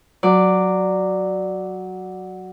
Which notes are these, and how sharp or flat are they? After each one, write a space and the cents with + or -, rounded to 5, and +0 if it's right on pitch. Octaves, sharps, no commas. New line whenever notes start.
F#3 +0 D5 +0